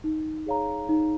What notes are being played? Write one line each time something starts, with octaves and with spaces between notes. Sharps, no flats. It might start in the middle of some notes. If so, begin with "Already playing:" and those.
D#4
G#4 C#5 F5 A#5
D#4